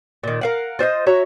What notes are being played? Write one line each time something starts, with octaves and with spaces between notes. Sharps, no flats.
A#2 D#3
A#4 F5 F#5
F4 C5 C#5 D#5
F#4 C#5 E5 A#5